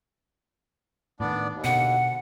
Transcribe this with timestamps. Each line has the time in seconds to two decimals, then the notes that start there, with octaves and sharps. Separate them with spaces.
1.20 A2 D#3 B3 D4 D5
1.52 D#2
1.64 B2 D3 F#5